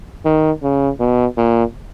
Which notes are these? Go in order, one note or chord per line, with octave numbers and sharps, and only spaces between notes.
D#3
C#3
B2
A#2